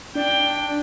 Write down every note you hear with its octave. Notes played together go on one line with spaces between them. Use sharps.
D4 G5